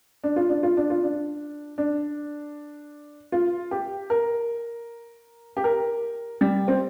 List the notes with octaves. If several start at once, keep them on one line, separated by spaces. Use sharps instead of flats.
D4
F4
D4
F4
D4
F4
D4
D4
F4
G4
A#4
G4
A#4
G3
C4